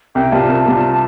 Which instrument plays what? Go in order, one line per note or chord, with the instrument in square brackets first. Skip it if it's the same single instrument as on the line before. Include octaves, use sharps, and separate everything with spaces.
[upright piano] C2 [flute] G5
[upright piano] C3 G3 F4 [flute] A5
[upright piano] C2
C3 G3 F4